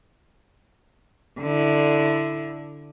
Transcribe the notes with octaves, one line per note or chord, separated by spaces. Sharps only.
D3 E4